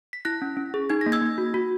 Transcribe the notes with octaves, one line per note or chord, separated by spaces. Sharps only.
B6
E4 F#6 A#6
C#4
C#4
G#4
D#4 G#6
A#6
A#3
E6 G#6
A#3
F#4
F#4